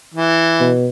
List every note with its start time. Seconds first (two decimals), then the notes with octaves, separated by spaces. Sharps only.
0.14 E3
0.60 B2